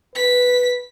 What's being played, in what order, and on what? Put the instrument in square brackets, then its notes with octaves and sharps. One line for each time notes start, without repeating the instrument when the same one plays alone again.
[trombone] B4 [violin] B6